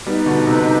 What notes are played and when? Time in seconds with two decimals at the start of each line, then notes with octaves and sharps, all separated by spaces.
0.06 G3 B3 D#4 B4 D#5
0.26 B2 D3
0.47 C3